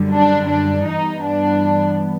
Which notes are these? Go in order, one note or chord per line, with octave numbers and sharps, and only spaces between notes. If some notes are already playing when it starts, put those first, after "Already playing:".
Already playing: F#2 D3 G3
D4
D4
G2 E3 G3 B3 D#4
D4